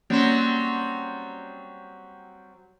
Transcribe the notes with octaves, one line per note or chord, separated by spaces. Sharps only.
F#3 G3 A#3 C4 C#4 C6